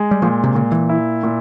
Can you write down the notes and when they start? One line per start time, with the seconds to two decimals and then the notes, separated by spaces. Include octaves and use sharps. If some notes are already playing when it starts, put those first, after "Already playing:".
Already playing: G#3
0.11 G3
0.22 A#2 F3
0.44 C3
0.55 A#2 C#3
0.72 E3
0.89 E4
1.23 A#2